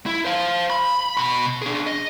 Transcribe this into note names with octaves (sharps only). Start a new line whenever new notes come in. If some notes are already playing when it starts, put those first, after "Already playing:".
E4
C5 F5
B5
B2 B5
D4 G#4
D#5